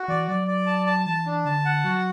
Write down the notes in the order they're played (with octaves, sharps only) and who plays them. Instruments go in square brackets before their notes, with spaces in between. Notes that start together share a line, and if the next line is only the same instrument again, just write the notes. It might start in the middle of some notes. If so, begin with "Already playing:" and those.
Already playing: [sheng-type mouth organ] F#4
[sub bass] E3 [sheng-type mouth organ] D5
[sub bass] F#3 [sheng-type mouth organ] D5
[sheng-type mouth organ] D5
A5
A5
[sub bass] E3 [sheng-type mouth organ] A5
[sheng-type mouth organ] D4
[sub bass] D3 [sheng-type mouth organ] A5
[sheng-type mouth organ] F#5
[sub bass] F#3 [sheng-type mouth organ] F#4